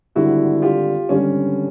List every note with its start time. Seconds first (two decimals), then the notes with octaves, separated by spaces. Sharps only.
0.15 G#1 G2 D3 G3 E4 F#4
0.62 F4 G4
1.09 G#1 G2 D3 G3 C#4